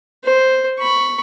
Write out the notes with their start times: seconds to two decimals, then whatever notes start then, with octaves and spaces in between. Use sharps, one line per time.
0.24 C5
0.79 B5 C#6